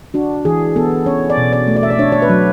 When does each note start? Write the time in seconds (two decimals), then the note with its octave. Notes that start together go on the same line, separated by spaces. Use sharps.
0.14 D4 F#4
0.45 E3 G#4
0.76 B3 A4
1.06 C#4 C#5
1.30 D5
1.37 B2
1.53 D5
1.68 A3
1.76 D5
1.83 E5
1.90 D5
1.99 D4 C#5
2.12 C#5
2.22 B4
2.29 F#3